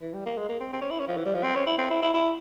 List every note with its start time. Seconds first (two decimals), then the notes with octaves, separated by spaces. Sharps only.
0.01 E3
0.14 G3
0.26 A#3
0.37 G#3
0.49 A#3
0.60 C4
0.73 C4
0.82 C#4
0.91 E4
0.99 C#4
1.08 F3
1.17 E3
1.26 G3
1.35 F3
1.43 C4
1.55 C#4
1.67 E4
1.78 C4
1.90 E4
2.02 E4
2.14 E4